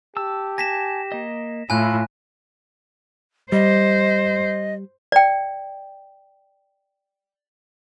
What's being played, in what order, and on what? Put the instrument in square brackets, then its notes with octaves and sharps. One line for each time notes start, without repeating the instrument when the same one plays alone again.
[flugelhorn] G4 [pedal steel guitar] A5 E6
[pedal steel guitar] G#5 A5 [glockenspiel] A#6 B6 E7
[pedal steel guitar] A#3 D#5
[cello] A2 [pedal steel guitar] E4 [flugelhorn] F4 [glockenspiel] G#5 F#6
[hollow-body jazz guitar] G3 [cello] C5 [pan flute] D#5
[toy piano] D5 G5